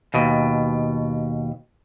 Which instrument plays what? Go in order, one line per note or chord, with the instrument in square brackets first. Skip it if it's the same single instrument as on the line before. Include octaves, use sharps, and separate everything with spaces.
[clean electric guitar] D#2 B2